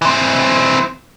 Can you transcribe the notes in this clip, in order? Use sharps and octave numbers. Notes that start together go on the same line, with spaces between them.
E3 C4